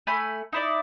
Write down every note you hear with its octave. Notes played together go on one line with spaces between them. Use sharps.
A3 G#5 B5
D#4 E4 D5